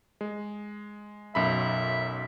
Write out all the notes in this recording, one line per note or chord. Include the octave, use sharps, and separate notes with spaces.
G#3
B1 F#2 E5 B5